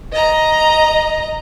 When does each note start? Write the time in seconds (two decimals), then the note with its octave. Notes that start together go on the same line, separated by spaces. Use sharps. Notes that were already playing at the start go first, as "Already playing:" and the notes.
0.13 D#5 A#5